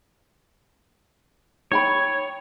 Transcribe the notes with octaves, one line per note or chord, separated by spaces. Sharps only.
D#4 C#5 G5 B5